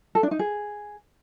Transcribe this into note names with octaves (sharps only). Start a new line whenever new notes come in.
A4
D4
D#4
G#4